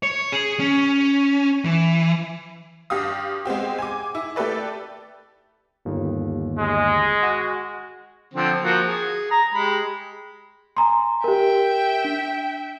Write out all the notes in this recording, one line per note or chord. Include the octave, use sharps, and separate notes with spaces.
C#5
G#4
C#4
E3
G2 G4 F5 D#6
G#3 B3 C4 G4
G#5 D6
E4
A3 G4 A4 B4 D5
G1 D#2
G#3
F#4
D3 F3 C4
F3 A#3 F#4
G#4
A#5
G#3 G4 B5
G#5 A#5 C6
G4 A#4 E5 G5
D4